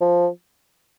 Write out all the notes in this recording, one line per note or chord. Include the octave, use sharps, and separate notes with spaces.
F3